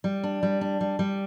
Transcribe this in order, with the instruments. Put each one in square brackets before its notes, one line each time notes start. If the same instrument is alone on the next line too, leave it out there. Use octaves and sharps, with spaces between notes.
[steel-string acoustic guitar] G3
D4
G3
D4
G3
G3